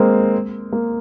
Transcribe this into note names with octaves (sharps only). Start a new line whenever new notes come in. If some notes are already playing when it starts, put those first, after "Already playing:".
Already playing: G#3 A#3 C4
A#3